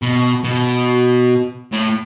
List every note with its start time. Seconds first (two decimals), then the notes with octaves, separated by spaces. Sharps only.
0.02 B2
0.44 B2
1.72 A2